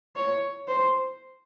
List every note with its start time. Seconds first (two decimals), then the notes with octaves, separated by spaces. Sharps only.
0.16 C#5
0.68 C5